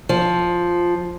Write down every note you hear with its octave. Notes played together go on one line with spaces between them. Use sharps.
F3